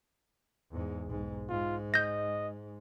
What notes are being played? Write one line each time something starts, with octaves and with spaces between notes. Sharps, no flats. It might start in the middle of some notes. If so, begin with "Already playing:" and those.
E2 G#2
B1 G#2
G#2 F4
D#5 G6 A#6